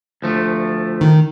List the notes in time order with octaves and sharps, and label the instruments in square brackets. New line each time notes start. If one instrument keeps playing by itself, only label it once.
[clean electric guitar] D2 F3 A3
[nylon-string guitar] D#3